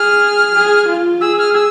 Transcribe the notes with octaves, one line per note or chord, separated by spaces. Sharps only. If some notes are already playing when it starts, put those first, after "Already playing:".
Already playing: G#4 F6
G#4
F4
G#4 E6
F6
E6